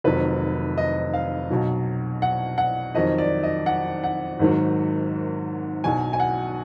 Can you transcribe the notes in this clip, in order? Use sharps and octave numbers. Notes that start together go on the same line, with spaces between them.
F1 F2 D#3 F#3 B4
D#5
F5
B1 B2 F#3
F#5
F#5
F2 D#3 F#3 D#5
D5
D#5
F#5
F#5
G#1 G#2 D#3 F#3
B1 B2 F#3 G#5
G#5
F#5